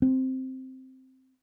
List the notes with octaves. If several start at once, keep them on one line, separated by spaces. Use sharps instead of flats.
C4